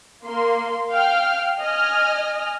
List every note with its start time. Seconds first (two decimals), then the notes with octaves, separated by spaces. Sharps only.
0.24 A#3 C6
0.91 F5 G5 F6
1.60 D#5 G#5 F6